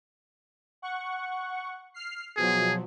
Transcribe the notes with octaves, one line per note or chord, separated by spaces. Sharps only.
F#5 C#6
F6 C7
B2 F3 F#3 G#4